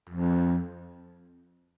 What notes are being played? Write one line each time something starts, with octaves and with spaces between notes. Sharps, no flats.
F2